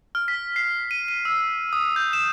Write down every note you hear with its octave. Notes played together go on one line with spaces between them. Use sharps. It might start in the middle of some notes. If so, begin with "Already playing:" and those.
F6
B6
C7
D#7
D#7
E6
D#6
G6
E7